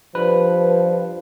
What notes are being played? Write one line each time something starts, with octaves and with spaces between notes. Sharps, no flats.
G2 F3 B4